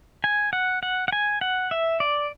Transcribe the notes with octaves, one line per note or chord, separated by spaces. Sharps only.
G#5
F#5
F#5
F#5
G#5
F#5
E5
D5